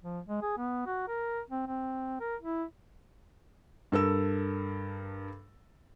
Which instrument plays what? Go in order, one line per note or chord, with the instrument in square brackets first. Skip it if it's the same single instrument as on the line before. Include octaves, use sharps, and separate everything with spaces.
[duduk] F3
G#3
G#4
B3
F#4
A#4
C4
C4
A#4
E4
[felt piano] G2 A4 A#4 E6